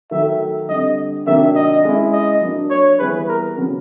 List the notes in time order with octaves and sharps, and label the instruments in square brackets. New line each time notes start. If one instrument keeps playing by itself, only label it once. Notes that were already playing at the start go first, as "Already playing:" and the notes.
[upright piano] D#3 F#3 A3 [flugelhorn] E5
[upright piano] D3 G3 C4 [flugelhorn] D#5
[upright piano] C3 D#3 F#3 A#3 D4 [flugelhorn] E5
[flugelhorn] D#5
[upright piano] G#3 C#4 E4
[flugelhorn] D#5
[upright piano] F#3 A#3 D4
[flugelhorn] C#5
[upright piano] E3 G3 B3 E4 G#4 [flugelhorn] B4
[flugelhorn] A#4
[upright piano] C#3 F#3 B3